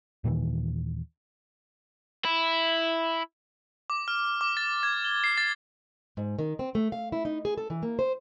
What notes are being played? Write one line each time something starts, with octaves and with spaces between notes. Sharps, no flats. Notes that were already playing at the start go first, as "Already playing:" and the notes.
D#2 A#2 D#3 E3
E4
D6
F6
D6
A6
G#6
G7
C7
A6
G#2
D#3
C4
A3
F5
E4
D#4
G#4
A4
E3
A#3
C5